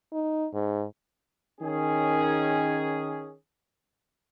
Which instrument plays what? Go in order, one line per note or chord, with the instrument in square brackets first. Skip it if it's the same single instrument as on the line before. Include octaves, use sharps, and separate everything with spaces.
[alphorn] D#4
G#2
[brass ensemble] D#3 C#4 G#4